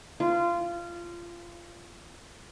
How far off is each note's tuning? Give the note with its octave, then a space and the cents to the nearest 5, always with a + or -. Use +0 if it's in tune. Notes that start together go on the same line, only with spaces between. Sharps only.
F4 -20